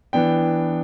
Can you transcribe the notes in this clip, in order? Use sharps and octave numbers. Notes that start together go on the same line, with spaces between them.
E3 B3 D4 G5